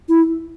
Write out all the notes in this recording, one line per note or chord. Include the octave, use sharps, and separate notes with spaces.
E4